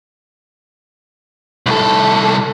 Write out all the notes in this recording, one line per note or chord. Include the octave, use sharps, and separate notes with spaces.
C2 A4